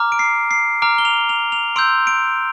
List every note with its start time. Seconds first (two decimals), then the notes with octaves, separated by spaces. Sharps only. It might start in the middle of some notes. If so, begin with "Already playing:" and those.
Already playing: A#5 D6 F6
0.12 D7
0.19 C7
0.51 C7
0.82 A#5 D6 F6 D7
0.98 G7
1.05 F7
1.29 F7
1.52 F7
1.76 C6 E6 G6 D7
2.07 D7